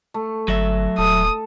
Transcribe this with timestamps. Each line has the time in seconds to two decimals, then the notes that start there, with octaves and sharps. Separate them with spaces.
0.14 A3
0.48 G1 F#3 E5
0.98 D#1 A4 D#6